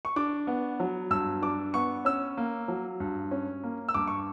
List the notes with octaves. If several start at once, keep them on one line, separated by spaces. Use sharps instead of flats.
C#6
D4 D6
B3
F#3
G2 E6
D4 D6
B3 C#6
C#4 E6
A#3
F#3
G2
C#4
A#3
E6
G2 D6
C#6